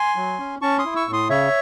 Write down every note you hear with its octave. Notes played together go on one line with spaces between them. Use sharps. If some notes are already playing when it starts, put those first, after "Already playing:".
Already playing: G#5 C6
F#3
C#4
C#4 A5 C#6
C6 D#6
E4
C#6 E6
A2
C6 D#6
C#3 C#5 E5